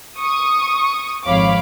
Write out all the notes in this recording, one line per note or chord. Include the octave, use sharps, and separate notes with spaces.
C#6 D#6
G#1 F2 C#5 F5 B5 D6